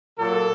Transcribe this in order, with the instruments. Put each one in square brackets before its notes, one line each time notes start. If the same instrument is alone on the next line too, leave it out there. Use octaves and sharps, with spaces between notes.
[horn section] A#2 F#3 A4